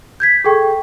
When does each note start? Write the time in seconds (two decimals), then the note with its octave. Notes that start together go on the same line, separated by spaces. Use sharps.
0.20 G6 G#6 B6
0.44 G#4 A4 G5 C#6